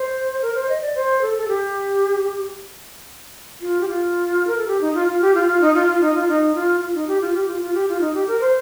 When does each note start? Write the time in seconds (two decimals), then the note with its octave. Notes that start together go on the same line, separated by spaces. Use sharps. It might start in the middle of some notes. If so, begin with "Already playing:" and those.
Already playing: C5
0.42 A#4
0.55 C5
0.69 D#5
0.81 D5
0.95 C5
1.22 A4
1.38 A4
1.48 G4
3.61 F4
3.81 G4
3.88 F4
4.47 A#4
4.57 A4
4.68 G4
4.81 D#4
4.95 F4
5.08 F4
5.21 G4
5.35 F4
5.48 F4
5.61 D#4
5.75 F4
5.87 F4
6.01 D#4
6.15 F4
6.28 D#4
6.55 F4
6.81 F4
6.94 D#4
7.08 G4
7.21 F4
7.34 G4
7.48 F4
7.61 F4
7.74 G4
7.88 F4
8.01 D#4
8.14 G4
8.27 A#4
8.41 C5